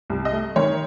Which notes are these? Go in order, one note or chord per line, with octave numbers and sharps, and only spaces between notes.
C2
D#5
A3
D#3 C#5